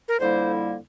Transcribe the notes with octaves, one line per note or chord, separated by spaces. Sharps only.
A#4
F2 D3 G3 A#3 E4 C5